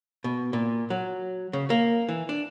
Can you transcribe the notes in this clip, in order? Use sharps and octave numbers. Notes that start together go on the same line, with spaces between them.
B2
A#2
F#3
C#3
A#3
E3
D4